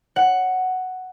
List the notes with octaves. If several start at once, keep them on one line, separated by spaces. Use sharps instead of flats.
F#5